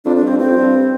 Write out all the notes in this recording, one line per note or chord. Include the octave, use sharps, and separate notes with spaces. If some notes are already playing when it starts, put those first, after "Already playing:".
F2 D4
D4
G2
C4
A2 C4
F2
G2